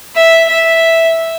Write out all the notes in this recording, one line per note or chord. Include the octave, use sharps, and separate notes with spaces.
E5
E5